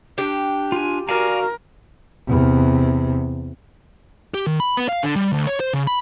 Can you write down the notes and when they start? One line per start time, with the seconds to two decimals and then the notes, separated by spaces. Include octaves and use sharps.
0.18 D4 G4
0.72 F4 G#5
1.09 F#4 A#4 D5 F5 G#5
2.27 E2 C3
4.34 G4
4.47 D#3
4.60 B5
4.77 B3
4.89 F5
5.03 D3
5.16 G3
5.33 D2
5.47 C#5
5.60 C5
5.73 C#3
5.87 B5